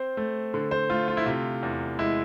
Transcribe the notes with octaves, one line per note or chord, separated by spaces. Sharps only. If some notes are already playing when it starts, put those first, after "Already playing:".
Already playing: C4 C5
A3
D3
C5
A3 F4
F4
E4
C3 F4
E2
G#3 E4